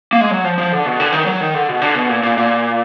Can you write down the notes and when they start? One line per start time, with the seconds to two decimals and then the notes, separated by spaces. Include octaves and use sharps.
0.13 A#3
0.21 G#3
0.31 F#3
0.44 F3
0.58 F3
0.72 D3
0.86 B2
1.00 D3
1.13 D#3
1.26 F#3
1.41 D#3
1.54 D3
1.69 B2
1.82 D3
1.95 B2
2.09 A#2
2.23 A#2
2.37 A#2